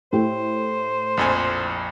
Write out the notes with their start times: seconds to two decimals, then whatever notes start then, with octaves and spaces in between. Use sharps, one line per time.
0.13 A2 A3 G4 C5
1.17 A#1 F2 G#5